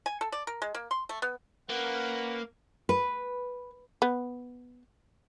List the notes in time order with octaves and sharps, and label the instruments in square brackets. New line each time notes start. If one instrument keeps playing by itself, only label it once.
[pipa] G#5
A4
D5
A#4
G#3
A#3
C6
A3
B3
[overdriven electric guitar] A#3 [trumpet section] C#4 B4 F#5
[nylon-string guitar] B4
[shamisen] B3